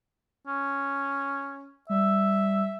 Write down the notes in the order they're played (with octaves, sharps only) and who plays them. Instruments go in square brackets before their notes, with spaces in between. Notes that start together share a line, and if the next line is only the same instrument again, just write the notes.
[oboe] C#4
[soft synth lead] G3 [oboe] E5